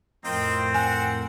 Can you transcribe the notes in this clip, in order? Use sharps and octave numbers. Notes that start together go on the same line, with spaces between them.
F2 A2 C4 F4 A#4 D#5 G5
F#5 G#5